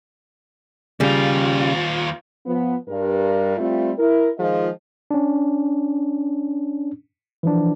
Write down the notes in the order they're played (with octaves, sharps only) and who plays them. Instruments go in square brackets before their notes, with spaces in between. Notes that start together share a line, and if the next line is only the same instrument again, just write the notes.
[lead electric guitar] D#2 F4 [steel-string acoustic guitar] C#3 G3
[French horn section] F3 B3
G2 A#4
G3 A3 C4 F4
E4 A#4
D#3 F3 G#3 F4 G#4 D#5
[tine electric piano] C#4 D4
E3 F3 D4